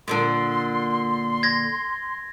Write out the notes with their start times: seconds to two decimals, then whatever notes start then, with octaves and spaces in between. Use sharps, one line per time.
0.08 A#2 D3 D4 C6
1.43 G#6 A#6